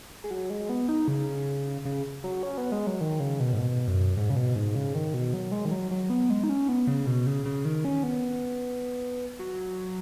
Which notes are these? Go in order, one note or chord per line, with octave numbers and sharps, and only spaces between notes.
G#3
F#3
G#3
B3
D#4
C#3
C#3
F#3
C#4
B3
G#3
F#3
D#3
C#3
B2
G#2
B2
F#2
G#2
C#3
B2
G#2
C#3
D#3
B2
F#3
G#3
D#3
F#3
F#3
B3
G#3
D#4
C#4
B3
C#3
B2
C#3
C#3
D#3
C#4
B3
F#3